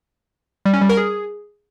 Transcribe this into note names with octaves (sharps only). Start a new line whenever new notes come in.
G3
C#4
G3
A#4
G#4